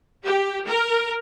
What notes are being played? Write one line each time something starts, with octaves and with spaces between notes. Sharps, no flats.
G4
A#4